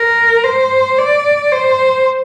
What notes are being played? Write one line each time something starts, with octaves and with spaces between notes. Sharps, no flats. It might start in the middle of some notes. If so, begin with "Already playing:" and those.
Already playing: A#4
C5
D5
C5